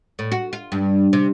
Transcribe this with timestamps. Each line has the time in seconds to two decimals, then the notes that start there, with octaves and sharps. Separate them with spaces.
0.19 A2
0.32 F#4
0.53 F4
0.72 G2
1.13 C3